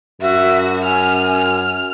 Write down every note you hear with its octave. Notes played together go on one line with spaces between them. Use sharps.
F#2 F#4 E5
G#5 F6